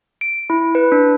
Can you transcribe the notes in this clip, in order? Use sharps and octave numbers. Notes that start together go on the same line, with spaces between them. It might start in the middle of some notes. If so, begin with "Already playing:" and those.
D7
E4
B4
D4